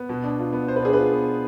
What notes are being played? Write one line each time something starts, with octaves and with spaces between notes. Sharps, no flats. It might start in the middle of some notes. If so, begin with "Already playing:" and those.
Already playing: B3
B2
D4
F4
B3
B2 C5
B4
D4 G#4
F4 B4
B3